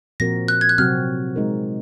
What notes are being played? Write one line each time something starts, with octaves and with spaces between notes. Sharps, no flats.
A#2 F3 C4 F#4 A#4 A#6
F#6
G#6
F#6
C3 F#3 C4 F#4 F6
G#3 D#4 A#4